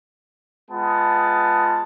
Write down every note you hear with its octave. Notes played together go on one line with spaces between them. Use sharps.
G#3 B3 F4 A5